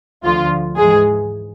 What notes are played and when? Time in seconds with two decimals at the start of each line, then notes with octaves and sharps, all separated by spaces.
0.24 D2 D3 F3 F4
0.77 G#2 E3 G#3 G#4